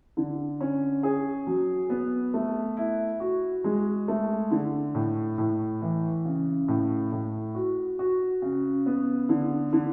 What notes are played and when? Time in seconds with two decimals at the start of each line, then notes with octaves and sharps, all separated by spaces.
0.17 D3
0.60 C#4
1.03 G#4
1.47 F#3
1.90 B3
2.34 A3
2.77 E4
3.20 F#4
3.64 G#3
4.08 A3
4.51 D3
4.95 A2
5.38 A2
5.81 E3
6.25 C#3
6.68 A2
7.12 A2
7.55 F#4
7.99 F#4
8.42 C#3
8.86 B3
9.29 D3
9.73 D3